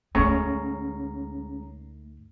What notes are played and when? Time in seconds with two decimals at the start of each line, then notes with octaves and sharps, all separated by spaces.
0.15 D2 G#2 G#3 A3 C#4 C#5 A#5